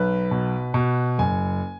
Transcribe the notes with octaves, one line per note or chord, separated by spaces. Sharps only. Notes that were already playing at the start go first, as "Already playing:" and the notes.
Already playing: B1 B4
B2
B2
F#1 G#5